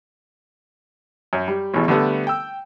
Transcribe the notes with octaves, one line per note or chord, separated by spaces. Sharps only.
F#2
G3
A1 B2 E3 G#3
D3 G3 A3 B3
G5 E6